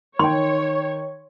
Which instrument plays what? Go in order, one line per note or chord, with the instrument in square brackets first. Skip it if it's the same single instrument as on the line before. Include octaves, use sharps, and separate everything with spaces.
[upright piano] D#3 G5 [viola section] C#5 [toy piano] C6